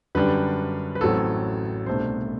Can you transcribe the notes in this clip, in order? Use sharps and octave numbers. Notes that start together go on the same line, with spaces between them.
F#2 D3 G3 D4 B4
B4
A1 A2 F#3 C4 A4
C2 B2 A3 D4 C5